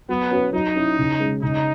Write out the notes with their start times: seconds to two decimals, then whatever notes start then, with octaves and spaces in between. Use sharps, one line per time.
0.09 F#3 B3
0.31 C#4 F#4 B4
0.53 F#3 D#4
0.75 C#4 E4
0.98 C#3
1.20 G#3 C#4
1.42 C#3 D#4